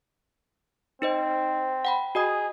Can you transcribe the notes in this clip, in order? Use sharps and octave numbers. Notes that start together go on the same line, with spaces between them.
C4 D#4 C5 D#5
F#5 G5 B5
F#4 G#4 D#5 D#6